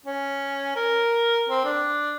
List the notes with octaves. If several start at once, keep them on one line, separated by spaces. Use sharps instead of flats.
C#4
A#4
C4
D4